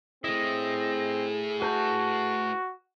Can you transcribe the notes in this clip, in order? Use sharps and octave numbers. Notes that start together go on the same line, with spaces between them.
A3 C4 E4 G#4 D#5
F#4 B4 A5 G6